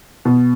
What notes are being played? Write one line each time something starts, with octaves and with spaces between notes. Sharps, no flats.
B2